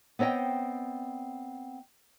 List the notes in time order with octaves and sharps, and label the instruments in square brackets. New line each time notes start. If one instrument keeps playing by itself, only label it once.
[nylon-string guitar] B3 C4 C#5 D#5 G5